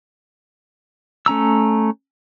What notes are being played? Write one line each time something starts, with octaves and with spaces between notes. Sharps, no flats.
A3 C#4 A#5 E6